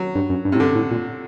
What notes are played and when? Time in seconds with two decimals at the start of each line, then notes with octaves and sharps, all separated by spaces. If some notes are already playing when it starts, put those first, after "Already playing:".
Already playing: F#3
0.15 G2
0.30 F#2
0.45 G2
0.52 A2 C3
0.60 G2 D3
0.75 A2
0.91 A#2